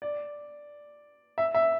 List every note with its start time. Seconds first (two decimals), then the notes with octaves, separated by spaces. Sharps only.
0.02 D5
1.38 E5
1.55 E5